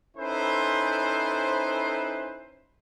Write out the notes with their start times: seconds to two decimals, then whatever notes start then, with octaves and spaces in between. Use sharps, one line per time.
0.17 C#4 D#4 E4 A4 B4 C5